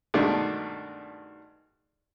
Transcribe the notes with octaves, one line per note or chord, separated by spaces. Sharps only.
G2 B2 D#3 G#3 A3 D4